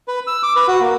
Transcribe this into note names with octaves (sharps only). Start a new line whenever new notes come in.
B4
E6
D6
B4
F#4
A#3